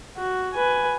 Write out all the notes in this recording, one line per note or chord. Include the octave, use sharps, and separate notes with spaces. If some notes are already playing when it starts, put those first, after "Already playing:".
F#4
B4 G#5